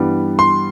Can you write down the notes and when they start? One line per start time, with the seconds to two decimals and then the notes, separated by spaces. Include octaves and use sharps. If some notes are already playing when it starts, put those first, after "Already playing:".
Already playing: G2 E3 G3 B3
0.39 C6